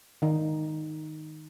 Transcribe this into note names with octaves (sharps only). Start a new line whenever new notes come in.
D#3 D#4